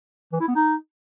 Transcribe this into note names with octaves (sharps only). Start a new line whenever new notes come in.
E3
E4
B3
D#4